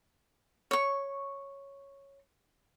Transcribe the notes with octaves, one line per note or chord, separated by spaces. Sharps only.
C#5 C#6